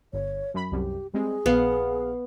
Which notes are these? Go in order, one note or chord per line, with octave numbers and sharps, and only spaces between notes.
G1 C#5
F#2 B5
C2 F#2 G4
G3 G#3 C4 G#4
A#1 B3 F5 F#5